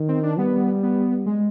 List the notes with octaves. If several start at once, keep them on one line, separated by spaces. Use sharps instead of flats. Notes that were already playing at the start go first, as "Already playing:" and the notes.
Already playing: D#3
C4
D4
G3 B3
B3
G#3